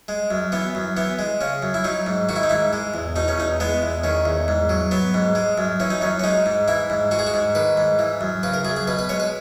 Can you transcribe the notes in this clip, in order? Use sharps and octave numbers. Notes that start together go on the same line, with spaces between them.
G#3
F#2
E3 B3
F#2
E3 B3
G#3
C#3 C#4
F#2
E4
F#3 D#4
G#2
D#3 F#4
E4
D#4
G#2 E4
G#3
E2
B2 D#4
C#4
E2 D#4
G#3 B3
E2
D#3 C#4
E2
G#2
F#3
F#3 B3
G#2
G#3
F#2
E3 C#4
D#4
F#2 C#4
C#4
G#3 D#4
G#2
E3 E4
G#2
G#3 F#4
G#4
F#4
G#2
D#3 B4
G#2
E3
F#2
C#3 B4
A#4
F#2 G#4
G#4
B2 B4
B4
G#3 C#5
B4